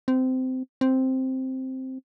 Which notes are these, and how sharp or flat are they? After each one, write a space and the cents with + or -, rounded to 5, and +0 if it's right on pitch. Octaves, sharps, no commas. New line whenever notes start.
C4 -20
C4 +0